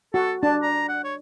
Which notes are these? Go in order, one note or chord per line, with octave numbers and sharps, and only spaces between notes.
F#4 A4
D4 A5
A#5
F#5
C#5